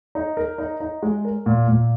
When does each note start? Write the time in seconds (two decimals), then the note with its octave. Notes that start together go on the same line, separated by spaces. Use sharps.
0.15 D#4
0.37 A#4
0.58 D#4
0.80 D#4
1.02 G#3
1.25 A#4
1.46 A#2
1.68 A#2